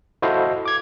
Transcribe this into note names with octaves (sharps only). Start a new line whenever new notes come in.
E4 F#4 A4 C5 D#5 F5
D6 G#6